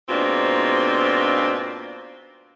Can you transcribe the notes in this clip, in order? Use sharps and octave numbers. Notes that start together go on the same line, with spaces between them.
G#2 B2 A#3 C4 D4 F4